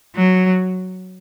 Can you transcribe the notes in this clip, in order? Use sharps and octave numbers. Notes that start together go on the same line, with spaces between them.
F#3